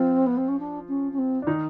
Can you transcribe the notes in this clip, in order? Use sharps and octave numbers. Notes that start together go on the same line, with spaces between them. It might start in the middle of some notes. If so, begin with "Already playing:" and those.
Already playing: F3 C4 F4
B3
C4
C#4
D4
C#4
C#4
C4
D4
D#3 D#4